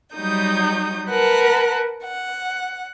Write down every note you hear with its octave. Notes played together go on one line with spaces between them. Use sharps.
F#3 G3 D#4 D#6 G6
A#4 B4 F#5 A5 F#6
F#5